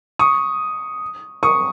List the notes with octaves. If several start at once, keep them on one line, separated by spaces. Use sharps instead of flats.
C#6 D#6
C#6 D#6